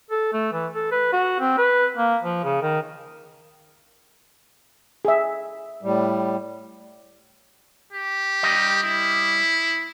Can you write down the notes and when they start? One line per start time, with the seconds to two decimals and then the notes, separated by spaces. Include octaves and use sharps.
0.11 A4
0.33 A3
0.53 E3
0.75 A4
0.91 B4
1.13 F#4
1.40 C4
1.58 B4
1.97 A#3
2.23 F3
2.44 C#3
2.62 D#3
5.05 G#4 E5
5.83 A2 G3
7.93 G4
8.43 G3 D#5
8.84 E4